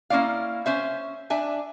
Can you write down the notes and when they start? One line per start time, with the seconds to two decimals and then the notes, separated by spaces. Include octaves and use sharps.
0.10 A#3 C#4 E4 D5 F5
0.66 C#4 C5 E5
1.30 D4 E5 G#5